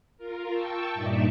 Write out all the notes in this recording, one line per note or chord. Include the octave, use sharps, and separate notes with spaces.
F4 A#4
G5 A5 C#6 E6
G2 A#2 D#4 D5 E5